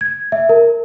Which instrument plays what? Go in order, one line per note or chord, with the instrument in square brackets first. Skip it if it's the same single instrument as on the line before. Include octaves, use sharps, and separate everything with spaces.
[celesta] G#6
E5
A#4